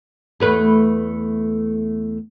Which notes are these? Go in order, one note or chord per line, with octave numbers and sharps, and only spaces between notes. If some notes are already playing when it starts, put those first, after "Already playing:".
E2 A3 B4